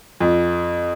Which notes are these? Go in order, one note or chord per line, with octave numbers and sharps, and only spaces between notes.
F2